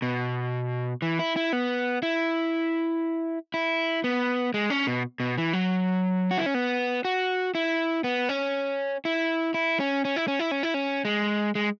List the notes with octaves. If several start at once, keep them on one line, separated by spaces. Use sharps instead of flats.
B2
E3
E4
E4
B3
E4
E4
B3
G#3
C#4
B2
B2
E3
F#3
F#4
E4
C#4
B3
F#4
E4
B3
C#4
E4
E4
C#4
C#4
E4
C#4
E4
C#4
E4
C#4
G#3
G#3